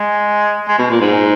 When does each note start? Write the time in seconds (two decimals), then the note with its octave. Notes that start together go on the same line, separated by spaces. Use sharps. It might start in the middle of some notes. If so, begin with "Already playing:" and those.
Already playing: G#3
0.68 G#3
0.78 B2
0.90 A#2
1.00 G#2